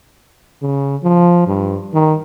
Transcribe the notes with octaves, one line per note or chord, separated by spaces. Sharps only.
C#3
F3
G2
D#3